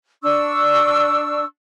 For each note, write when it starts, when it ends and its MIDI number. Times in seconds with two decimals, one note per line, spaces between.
0.23 1.44 62
0.23 1.44 85
0.23 1.44 88